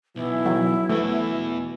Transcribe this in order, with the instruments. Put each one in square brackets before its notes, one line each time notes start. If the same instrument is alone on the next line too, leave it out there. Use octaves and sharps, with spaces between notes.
[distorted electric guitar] B1 [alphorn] E3 [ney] E4
[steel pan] F#3
[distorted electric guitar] E2 E3 [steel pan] A3 [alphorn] B3
[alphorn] B2